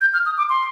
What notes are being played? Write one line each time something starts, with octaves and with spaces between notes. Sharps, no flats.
G6
F6
D#6
D6
C6